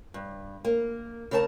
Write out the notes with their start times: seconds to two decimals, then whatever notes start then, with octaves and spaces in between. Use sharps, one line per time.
0.14 G2
0.65 A#3
1.31 C#3 A3 A#4 D5 A5 A#5